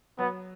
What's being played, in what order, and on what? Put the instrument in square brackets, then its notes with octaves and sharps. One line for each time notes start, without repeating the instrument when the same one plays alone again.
[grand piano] F#3 [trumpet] B3